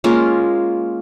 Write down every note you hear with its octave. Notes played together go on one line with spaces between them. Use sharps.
G#3 A#3 C#4 F4